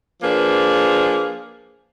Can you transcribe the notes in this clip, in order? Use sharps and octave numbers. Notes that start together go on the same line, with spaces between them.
F3 A#3 D4 G#4 B4